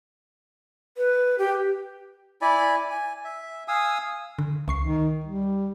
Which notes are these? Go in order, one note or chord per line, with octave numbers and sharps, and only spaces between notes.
B4
G4
E4 D5 G#5 B5
G#5
E5
F5 G#5 D#6 E6
D3
C#2 C#6 C7
D#3
G3